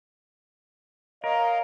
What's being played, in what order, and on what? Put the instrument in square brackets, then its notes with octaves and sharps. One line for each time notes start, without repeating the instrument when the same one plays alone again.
[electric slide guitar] A#4 [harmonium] C#5 D#5 F5